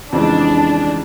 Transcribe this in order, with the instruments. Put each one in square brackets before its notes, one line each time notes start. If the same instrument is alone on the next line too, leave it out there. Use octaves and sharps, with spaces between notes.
[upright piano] F2 C#3 E3 G#3 [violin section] D4